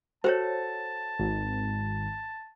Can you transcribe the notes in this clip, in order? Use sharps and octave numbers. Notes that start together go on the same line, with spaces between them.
F#4 A4 C5 C#5 A5
G#1